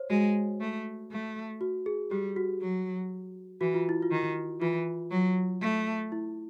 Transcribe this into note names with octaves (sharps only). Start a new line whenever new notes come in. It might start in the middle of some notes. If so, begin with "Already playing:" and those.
Already playing: C5 C#5
G#3 F#4
A3
A3
F#4
G#4
G3 G4
F#4
F#3
E3 F#4
F4
E4
F4
D#3
E3 F4
F#3
A3
E4